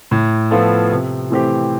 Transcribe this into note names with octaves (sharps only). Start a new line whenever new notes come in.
A2
F3 B3 F4 A4
C3
E3 A3 C4 G4